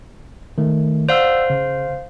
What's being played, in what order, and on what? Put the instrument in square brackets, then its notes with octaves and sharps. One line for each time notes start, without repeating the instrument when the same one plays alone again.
[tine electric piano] D#3 A3
[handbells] C5 F5 [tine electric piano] D5 F#5 E6
[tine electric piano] C#3